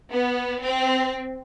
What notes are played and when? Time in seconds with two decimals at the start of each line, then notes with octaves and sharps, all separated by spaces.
0.11 B3
0.64 C4